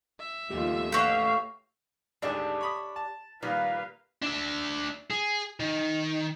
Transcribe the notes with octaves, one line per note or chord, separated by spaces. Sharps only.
E5
D#2 A3 B3 F4 G4
A3 F#4 G4 B4 C#5 F5
G#1 D2 G#2 D4 G4 E5
C#5 B5 D#6
A5
A#2 D#3 G3 A#3 B4 F5
D4 E5
G#4
D#3